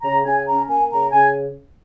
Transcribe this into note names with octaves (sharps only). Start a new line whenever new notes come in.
C#3 A#5
C#3 G#5
C#4 A#5
A#3 G#5
C#3 A#5
C#3 G#5